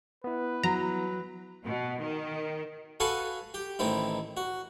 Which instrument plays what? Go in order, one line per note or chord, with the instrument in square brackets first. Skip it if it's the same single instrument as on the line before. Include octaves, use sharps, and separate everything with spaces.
[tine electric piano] B3 E4 [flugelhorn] B4
[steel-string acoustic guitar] F#3 [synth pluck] A#5
[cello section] B2
D#3
[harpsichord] F#4 A4 B4 F5 F#5 G#5
G4
A1 D#3 C4 E4
F#4